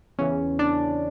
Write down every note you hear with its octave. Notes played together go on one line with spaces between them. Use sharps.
E2 C#3 E3 C#4
D4